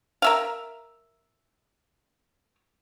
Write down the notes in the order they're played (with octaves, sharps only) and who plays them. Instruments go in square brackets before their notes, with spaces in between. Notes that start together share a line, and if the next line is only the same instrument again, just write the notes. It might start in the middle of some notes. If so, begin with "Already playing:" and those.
[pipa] A#4 E5 F5